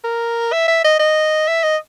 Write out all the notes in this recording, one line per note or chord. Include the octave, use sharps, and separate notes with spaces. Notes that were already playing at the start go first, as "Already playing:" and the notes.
A#4
E5
E5
D#5
D#5
E5
D#5